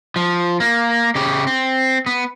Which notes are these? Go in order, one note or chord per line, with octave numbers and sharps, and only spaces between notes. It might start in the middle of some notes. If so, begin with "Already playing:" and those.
F3
A#3
C#3 G4
C4
B3